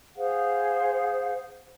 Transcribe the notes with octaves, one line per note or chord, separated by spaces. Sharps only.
G#4 C5 F5 F#5